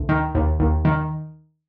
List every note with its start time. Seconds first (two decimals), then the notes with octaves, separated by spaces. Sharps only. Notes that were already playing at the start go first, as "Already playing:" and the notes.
Already playing: D2
0.09 D#3
0.35 D#2
0.60 D#2
0.85 D#3